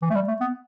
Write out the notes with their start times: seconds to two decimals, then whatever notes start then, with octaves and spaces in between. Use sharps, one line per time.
0.02 E3
0.10 A3
0.15 G3
0.28 A3
0.41 B3